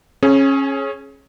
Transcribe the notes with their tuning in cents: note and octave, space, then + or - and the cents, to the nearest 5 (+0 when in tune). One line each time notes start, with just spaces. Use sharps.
C#4 -20 G#4 +25